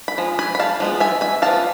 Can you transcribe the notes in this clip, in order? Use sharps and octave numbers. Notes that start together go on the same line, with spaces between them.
B5
F3 G#3
G#5 B5
B5
F5 A5
F3 G#3 B3
E5 G#5
E5 G#5
F3 B3 D4 F5 A5